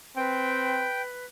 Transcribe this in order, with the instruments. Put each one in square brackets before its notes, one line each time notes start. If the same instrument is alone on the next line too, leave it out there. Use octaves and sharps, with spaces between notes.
[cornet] C4 [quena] B4 [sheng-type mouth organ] G5